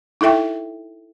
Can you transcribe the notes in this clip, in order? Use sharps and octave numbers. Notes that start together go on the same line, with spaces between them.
D#4 E4 A4 E5 G5